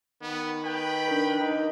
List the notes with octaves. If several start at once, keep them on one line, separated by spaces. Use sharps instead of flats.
D#3 B3
B4 G5 B5
D4 A#4
D#4